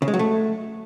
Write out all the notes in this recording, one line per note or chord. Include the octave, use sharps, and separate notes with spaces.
C#3
G#3
F#3
A3